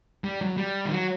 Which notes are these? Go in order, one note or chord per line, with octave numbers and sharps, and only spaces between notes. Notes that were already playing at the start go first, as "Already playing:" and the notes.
G3
F#3
G3
D#3
F#3